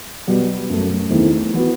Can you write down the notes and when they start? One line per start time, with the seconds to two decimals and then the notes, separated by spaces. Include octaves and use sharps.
0.27 B2 G3 B3
0.70 F#2 F#3 A3
1.10 E2 D#3 A3 C4 E4
1.54 E3 B3 F#4